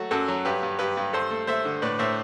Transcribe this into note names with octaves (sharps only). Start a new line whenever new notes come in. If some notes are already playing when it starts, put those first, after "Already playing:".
Already playing: F#3 A3 F#4
F#2 F#4 A4
F#3
G2 G4 B4
G2
G2 G4 B4
G2
G2 A4 C5
A3
A3 C5 E5
D3
A2 B4 D5
A2 C5 E5